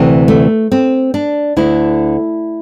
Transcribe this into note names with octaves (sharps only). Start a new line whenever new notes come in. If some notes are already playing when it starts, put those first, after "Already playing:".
Already playing: D2 C3 E3
A3
C4
D4
D2 D3 E4